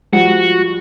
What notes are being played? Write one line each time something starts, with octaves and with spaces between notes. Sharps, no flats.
F3 G3 F#4